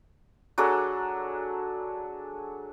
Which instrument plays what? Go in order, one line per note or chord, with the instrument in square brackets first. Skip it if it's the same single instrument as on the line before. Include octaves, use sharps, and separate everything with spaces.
[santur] F#3 D4 G#4 A4